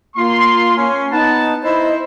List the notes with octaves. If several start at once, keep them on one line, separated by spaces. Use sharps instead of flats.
A#3 F4 C6
C#4
B3 D#4 A5
E4 C5 D#5